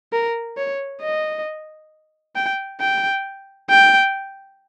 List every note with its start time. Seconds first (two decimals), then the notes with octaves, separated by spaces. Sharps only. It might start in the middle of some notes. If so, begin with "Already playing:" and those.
0.13 A#4
0.58 C#5
1.02 D#5
2.36 G5
2.81 G5
3.70 G5